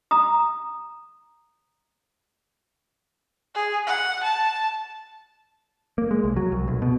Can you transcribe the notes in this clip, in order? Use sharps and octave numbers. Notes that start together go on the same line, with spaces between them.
A#5 D#6
G#4
F#5
A5
A#3
G#3
C2
F#3
C2
B1
B2